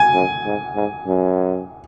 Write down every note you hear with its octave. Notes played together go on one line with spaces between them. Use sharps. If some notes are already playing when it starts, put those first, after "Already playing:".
Already playing: G#5
F#2
G#2
G#2
F#2